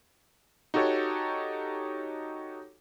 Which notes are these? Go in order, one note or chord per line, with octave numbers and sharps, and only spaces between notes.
D#4 F#4 G4 A4 C#5